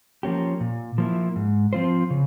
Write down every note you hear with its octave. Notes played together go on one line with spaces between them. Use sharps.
F3 A#3 C#4 G4
A#2
F3 A#3 E4
G#2
F3 C4 F4 C5
C#3